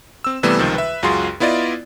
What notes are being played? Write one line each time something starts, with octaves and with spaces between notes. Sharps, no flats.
C4 E6
C3 E3 G3 A3 B3 E7
C#2 C3 D#3 F3
B4 E5
C#2 F#2 F4 F#4 G#4 C6
B3 E4 F4 D5 D#5